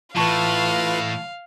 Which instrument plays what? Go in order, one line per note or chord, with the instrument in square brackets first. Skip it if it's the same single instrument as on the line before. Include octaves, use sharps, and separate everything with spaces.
[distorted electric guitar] A2 [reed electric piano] E3 A5 C#6 [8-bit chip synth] F4 B4 [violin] F5